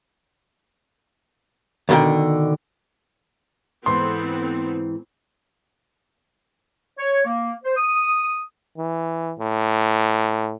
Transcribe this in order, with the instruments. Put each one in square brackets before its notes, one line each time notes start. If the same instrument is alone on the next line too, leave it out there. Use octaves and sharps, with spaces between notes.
[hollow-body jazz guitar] D#2 B2 D3 D#3 G5
[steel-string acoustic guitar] G#2 E3 [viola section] B3 C4 A4 [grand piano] C6
[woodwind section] C#5
A#3
C5
D#6
[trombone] E3
A2